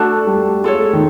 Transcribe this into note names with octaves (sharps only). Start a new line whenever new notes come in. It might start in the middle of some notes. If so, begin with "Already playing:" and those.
Already playing: A3 D4 F#4 A4 D5
G3
G#3 F4 A4 C#5
A3
G#3
D#3